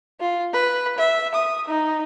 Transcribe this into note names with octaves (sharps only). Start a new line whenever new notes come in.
F4
B4
E5
D#6
D#4